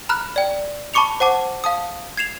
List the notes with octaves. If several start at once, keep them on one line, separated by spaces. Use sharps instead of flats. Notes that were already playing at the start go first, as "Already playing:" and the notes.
A#5 B5 F6 F#6
D5 G5
A5 B5 C#6 D6 C#7 F7
C5 F#5 A5 D6
F5 A5 D#6
G#6 C7 E7 F7